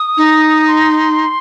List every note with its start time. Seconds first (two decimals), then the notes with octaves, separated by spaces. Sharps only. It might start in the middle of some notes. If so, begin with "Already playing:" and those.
Already playing: D#6
0.17 D#4
0.68 C6